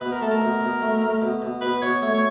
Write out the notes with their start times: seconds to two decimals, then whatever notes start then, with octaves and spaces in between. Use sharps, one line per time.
0.01 B2 B4
0.11 A#4
0.21 A3 A4
0.32 A#4
0.41 B2
0.61 B2
0.82 A3
1.02 A3
1.21 B2
1.42 B2
1.61 B2 B4
1.82 B2 C#5
2.02 A3 C#5
2.14 C#5